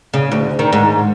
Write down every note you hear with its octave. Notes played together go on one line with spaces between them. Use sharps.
C#3
D2
D#3
G#2